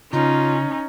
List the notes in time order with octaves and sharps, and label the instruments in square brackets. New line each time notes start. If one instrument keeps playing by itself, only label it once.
[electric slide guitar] C#3 [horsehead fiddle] C#4 [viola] D#4 [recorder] F4